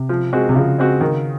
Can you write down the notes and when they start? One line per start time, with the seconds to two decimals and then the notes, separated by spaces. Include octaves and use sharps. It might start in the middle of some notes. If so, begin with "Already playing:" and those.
Already playing: C3
0.09 F3
0.33 G#3 C4 F#4
0.49 C3
0.55 C#3 F3
0.78 G#3 C4 F#4
1.01 D#3